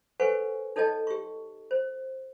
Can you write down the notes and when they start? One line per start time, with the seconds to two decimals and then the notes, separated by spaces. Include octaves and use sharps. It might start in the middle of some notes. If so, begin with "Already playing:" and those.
0.20 A4 B4 C5 F#5 G#5 C#6
0.76 D#4 A4 C#5 D#5 G5 A5
1.07 G4 C#6
1.71 C5